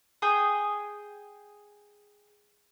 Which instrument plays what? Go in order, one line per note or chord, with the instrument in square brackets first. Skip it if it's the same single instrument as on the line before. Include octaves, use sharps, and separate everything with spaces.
[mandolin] G#4 G5 D#6